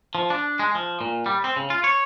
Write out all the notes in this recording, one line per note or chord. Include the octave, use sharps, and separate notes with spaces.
F3
D4
G#3
F3
A#2
G3
C4
C#3
F4
C#5